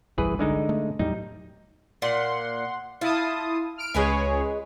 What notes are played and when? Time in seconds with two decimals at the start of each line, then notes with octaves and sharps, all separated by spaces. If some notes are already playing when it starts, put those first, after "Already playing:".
0.18 G1 C2 E3 G3 G#4 B4
0.39 D3 G#3 D#4
0.69 A3
0.99 E2 A2 F#3 G3 D#4
2.02 A#2 F#5 C6
3.01 E4 F4 A5 D#6
3.77 F6 D7
3.94 C#2 G#3 G#4 B4 C#5 G#5